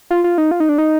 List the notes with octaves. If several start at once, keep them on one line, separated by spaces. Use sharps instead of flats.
F4
F4
D#4
F4
D#4
D4
D#4